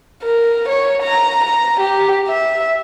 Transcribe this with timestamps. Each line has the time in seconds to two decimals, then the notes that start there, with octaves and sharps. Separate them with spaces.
0.23 A#4
0.68 C#5
1.02 A#5
1.44 A#5
1.80 G4
2.28 E5